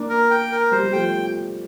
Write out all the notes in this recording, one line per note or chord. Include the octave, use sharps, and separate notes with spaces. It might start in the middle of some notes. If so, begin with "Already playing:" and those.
Already playing: A#3 D4
A#4
G5
A#4
G3 C5
G3
F3 A3 G5